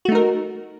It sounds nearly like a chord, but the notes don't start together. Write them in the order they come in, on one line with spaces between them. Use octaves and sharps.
F#4 A3 D#4 A#4